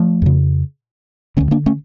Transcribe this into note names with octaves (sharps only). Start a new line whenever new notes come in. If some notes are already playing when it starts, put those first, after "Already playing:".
Already playing: F3 A3
F2 C#3
D2 D3 A3 C#4
A#3 D4
A3 C#4